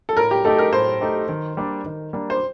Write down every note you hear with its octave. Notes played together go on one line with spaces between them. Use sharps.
A4
A2 A#4
G4
A3 D#4 G4 A4
A#4
A2 C5
A3 D#4 G4
D#3
G3 A#3 D4
D#3
G3 A#3 D4
C5